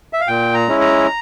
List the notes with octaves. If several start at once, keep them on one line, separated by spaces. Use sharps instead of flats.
E5
F5
A#2 G5
A#5
G#3 C#4 E4
A#5